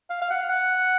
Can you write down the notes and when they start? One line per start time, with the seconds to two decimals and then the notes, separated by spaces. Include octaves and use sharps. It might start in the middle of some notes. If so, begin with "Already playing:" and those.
0.10 F5
0.22 F5
0.30 F#5
0.49 F#5